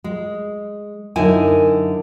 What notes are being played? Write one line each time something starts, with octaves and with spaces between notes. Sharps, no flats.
G#3
F#2 D3 D#4 E4 G#5